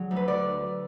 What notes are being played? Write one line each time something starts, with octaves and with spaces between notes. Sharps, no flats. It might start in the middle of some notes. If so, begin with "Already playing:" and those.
Already playing: D3 F#3 G#4
D2
B4
D3 D5